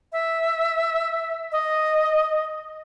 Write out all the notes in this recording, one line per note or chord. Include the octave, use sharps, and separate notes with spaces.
E5
D#5